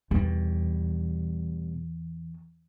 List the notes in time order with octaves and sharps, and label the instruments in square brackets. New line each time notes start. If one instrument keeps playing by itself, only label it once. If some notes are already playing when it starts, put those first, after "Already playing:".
[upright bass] E2 [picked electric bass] B2 G3